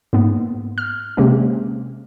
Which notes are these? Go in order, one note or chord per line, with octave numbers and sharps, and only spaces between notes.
G#2 A#3 B3
F6
C3 G#3 A#3 C#4